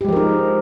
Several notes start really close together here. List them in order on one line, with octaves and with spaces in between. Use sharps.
G4 G#3 F3 A#4 D#4